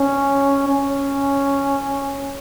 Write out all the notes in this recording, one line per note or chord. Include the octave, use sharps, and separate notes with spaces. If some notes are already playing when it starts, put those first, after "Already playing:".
Already playing: C#4
C#4